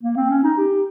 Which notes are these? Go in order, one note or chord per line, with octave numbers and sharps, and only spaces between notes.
A#3
C4
C#4
D#4
G4